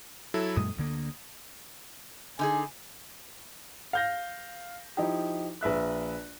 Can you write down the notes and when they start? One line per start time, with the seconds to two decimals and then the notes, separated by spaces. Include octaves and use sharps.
0.34 F#3 E4 A4
0.57 F#2 A#2 G#3 D#6
0.77 D2 D3 A#3
2.39 D3 D#4 G#4 G#5
3.93 F5 G6 A#6
4.97 F3 D#4 E4 G4
5.61 A#1 B4 E5 F#6